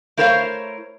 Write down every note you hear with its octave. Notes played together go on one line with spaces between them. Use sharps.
A3 E4 A#4 C5 C#5 F5